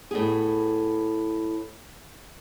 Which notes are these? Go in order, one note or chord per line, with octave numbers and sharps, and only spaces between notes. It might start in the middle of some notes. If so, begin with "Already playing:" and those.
A2 B3 G#4